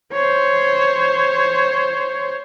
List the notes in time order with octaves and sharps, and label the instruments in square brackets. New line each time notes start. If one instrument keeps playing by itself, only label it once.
[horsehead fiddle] C5 C#5